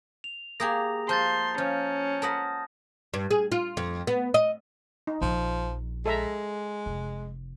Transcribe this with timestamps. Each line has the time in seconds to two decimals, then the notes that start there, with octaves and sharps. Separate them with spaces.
0.24 F7
0.60 A#3 G4 G#4 A#5 D#6 A#6
1.09 F3 A5 C6 G6 A6
1.58 F3 C#4
2.22 A#4 B4 F#5 A5 D#6 A#6
3.14 G2
3.31 G#4
3.52 F4
3.77 F2
4.07 B3
4.34 D#5
5.07 D#4
5.21 A#1 F3
6.06 G#3 A4 E5 A#5
6.86 F1